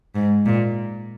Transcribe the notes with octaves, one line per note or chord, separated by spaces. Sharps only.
G#2
A#2